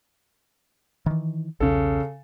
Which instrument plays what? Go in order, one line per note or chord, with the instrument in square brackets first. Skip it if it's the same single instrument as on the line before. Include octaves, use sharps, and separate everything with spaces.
[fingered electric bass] D#3 E3
[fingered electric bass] B1 E2 [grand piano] C#3 A4